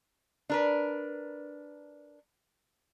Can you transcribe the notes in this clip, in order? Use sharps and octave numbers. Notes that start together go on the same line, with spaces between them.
D4 A#4 B4